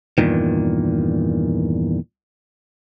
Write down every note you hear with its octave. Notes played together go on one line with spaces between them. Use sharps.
E2 G2 A#2 D#3